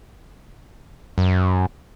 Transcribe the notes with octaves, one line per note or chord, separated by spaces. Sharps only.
F#2